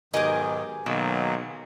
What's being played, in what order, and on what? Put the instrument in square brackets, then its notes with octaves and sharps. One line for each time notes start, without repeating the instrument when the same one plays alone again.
[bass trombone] B1 [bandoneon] G#2 D#3 [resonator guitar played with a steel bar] G4 A#4 D#5 [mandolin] G#4 D6
[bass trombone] B1 [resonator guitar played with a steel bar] B2 [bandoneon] D#3 F#3 A#3